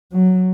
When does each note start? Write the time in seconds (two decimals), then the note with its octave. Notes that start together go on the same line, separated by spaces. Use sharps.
0.13 F#3